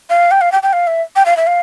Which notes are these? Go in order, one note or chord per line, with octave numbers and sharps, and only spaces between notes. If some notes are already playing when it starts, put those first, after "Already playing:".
F5
G5
F5
G5
G5
F5
E5
G5
F5
E5
F5